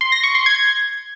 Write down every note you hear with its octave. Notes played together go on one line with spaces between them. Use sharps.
C6
A#6
C#6
C6
G#6